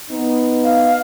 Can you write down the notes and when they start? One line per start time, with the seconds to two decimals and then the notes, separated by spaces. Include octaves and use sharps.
0.10 B3 D#4
0.64 F5